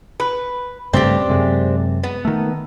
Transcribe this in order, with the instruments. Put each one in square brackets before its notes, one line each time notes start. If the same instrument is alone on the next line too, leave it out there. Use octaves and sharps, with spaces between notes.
[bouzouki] B4
[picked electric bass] G2 C#3 A3 [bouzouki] C4 D4 G4
[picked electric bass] F#2 C3 G#3
[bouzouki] B3
[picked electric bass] D#3 A3